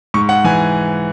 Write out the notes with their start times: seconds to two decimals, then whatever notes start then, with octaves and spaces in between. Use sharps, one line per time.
0.14 G#2 C#6
0.29 F#5
0.45 E3 G#5